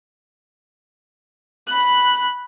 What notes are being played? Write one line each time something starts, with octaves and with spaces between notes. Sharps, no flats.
B5 F#6